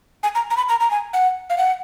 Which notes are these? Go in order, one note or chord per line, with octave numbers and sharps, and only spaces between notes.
G#5
A#5
A#5
B5
A#5
A#5
G#5
F#5
F5
F#5